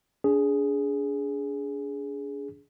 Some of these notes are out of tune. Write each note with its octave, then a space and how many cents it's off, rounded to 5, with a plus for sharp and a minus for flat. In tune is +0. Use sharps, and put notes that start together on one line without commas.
D4 -40 G#4 +0